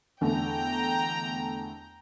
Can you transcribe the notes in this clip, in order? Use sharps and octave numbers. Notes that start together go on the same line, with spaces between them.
E2 D3 A3 G5 A#5